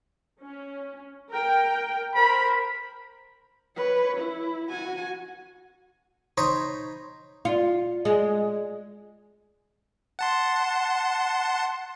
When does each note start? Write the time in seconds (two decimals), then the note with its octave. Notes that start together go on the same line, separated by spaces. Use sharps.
0.41 C#4
1.31 A#4 G5
2.15 A#4 C5 B5
3.76 B4 C#5
4.17 E4
4.69 F#4 G#5
6.37 D#4 C5 C#5 B5 C#6 D#6
7.45 F4
8.05 G#3
10.19 F#5 A5 C6